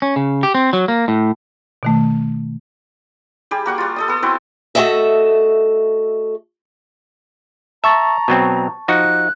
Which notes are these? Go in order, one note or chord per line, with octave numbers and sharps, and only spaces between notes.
C#4
C#3
G4
C4
F#3
A#3
A2
B2 D#3 A3
G3 G4 G#4
A#3 F#4 F#5 C#6
G3 F4
A4 D#5 D#6
B3 A4
C4 E4 F#4
A3 F#4 G#4 A4 D#5 E5
E5 A5 A#5 C#6 A6
B2 F#3 C4
F3 D#4 F#4 F#6